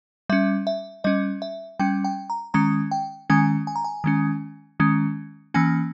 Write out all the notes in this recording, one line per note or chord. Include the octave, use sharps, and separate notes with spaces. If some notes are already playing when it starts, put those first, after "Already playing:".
G3 C#4 E5
E5
G3 C#4 D#5
E5
G3 C#4 G5
G5
A#5
D#3 G#3 C#4 A#5
G5
D#3 G#3 C#4 G#5
G#5
A#5
G#5
D#3 G#3 C#4
D#3 G#3 C#4
E3 A#3 C#4 G#5